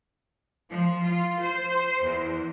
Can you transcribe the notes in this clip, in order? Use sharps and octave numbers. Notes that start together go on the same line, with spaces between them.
F3
F4
C5
E2